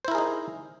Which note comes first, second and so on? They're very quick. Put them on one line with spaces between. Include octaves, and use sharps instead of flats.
C5 E4 A#4 G#4 D#4